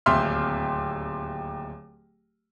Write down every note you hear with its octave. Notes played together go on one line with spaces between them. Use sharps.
D1 D#2 E5 C6 F6